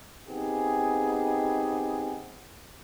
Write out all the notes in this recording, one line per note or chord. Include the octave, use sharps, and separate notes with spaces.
B3 C4 D#4 G4 G#4